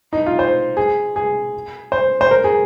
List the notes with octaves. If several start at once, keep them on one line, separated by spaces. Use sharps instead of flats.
D#4
F4
C5
G#4
G#4
C5
C5
A#4
G#4